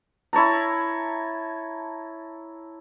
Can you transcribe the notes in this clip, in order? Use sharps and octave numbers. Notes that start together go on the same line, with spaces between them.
E4 C#5 A5 A#5